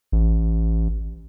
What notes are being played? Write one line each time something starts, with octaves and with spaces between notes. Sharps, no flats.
A1